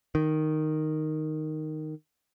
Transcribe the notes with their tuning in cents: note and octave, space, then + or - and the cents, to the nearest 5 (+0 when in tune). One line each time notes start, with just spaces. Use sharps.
D#3 -5